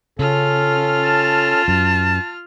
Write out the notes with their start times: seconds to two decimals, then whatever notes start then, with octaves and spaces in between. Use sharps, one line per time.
0.19 C#3 C#4 F4 A4 F6
1.04 A5
1.68 F#2